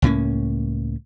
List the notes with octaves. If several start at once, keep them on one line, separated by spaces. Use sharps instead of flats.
C#2 A2 A#3 C#4